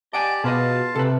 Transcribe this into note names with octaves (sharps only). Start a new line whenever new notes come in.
G4 D5 D#5 F#5 G#5 A5 D7
B2 F4 G#4 B4 D#5 F5 A5
C3 A4 B4